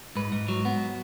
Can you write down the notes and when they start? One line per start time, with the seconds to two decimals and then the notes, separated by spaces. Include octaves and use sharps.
0.15 G#2 B4
0.32 G#2
0.48 F#3
0.65 B3